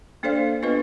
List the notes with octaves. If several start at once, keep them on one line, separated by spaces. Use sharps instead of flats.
A#3 D4 A4 C5 D5 F5
B3 D4 F4 B4 D#5